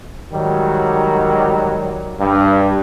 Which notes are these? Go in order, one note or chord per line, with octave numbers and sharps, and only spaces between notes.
G#2 D#3 F#3 G3
G2